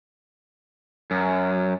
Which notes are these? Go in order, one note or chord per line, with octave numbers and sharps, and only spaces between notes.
F#2